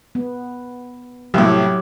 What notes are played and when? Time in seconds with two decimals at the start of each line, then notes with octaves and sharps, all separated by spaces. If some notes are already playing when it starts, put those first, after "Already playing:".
0.15 B3
1.34 C2 A2 F#3 G4